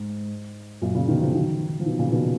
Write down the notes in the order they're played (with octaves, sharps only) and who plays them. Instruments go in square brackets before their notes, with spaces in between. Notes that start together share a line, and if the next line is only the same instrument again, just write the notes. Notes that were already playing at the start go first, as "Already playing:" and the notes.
Already playing: [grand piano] G#2
F#2 A#2
A#2 C#3
B2 D#3
C#3 F3
D#3 F#3
F3
B2 D#3
A#2 C#3
B2 D#3